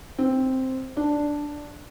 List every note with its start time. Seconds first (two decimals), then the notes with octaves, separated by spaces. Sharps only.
0.18 C4
0.97 D4